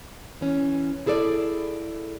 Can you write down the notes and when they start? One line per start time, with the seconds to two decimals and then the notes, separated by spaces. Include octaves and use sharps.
0.41 E3 C#4
1.06 E4 G#4 A4 C#5 D5